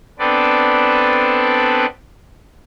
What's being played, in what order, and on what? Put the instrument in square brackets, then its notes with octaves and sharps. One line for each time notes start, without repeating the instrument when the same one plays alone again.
[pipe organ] B3 C4 D4 A4 B4 D5